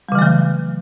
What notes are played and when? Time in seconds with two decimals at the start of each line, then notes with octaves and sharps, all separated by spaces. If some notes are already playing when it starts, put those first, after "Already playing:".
0.09 G3
0.12 C#3
0.15 E3
0.19 A3
0.22 F#3